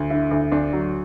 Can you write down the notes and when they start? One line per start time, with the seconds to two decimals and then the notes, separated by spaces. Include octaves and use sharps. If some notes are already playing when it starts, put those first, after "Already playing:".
Already playing: D2
0.10 D3 E4
0.31 D2
0.52 D2 D4
0.73 F#3